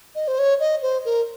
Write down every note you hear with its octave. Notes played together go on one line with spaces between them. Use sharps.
D#5
C5
C#5
D#5
C5
A#4